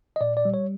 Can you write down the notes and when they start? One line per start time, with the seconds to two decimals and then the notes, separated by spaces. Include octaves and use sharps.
0.16 D#5
0.21 A#2 D5
0.37 D5
0.45 G3
0.54 C#5